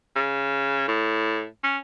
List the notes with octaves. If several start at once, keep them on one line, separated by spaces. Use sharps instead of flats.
C#3
A2
C#4